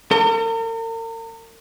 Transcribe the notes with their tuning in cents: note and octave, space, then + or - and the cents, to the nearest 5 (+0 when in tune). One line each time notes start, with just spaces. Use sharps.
A#4 -45